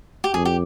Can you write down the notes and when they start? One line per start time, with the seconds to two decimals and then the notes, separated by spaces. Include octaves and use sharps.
0.24 G4
0.34 F2 G#4
0.45 G4